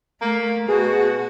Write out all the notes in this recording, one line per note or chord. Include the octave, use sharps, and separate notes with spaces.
A3 A#3
B2 F#4 G#4